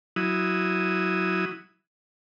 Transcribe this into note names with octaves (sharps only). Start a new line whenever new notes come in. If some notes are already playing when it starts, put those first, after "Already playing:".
F#3 E4 D#6